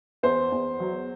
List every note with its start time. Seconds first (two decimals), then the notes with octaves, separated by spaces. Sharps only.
0.23 E2 C5
0.52 E2
0.80 F#3